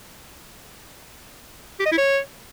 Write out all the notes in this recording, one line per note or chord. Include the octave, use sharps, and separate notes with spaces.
G4
D#5
E4
C#5